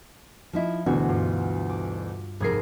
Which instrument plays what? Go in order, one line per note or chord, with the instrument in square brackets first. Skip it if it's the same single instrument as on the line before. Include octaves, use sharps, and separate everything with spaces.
[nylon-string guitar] F3 D#4 E4
[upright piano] D2 B2 E3 [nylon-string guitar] F#4
[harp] G2 F4
D6
[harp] F1 G#4 C7 [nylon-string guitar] G#2 A#4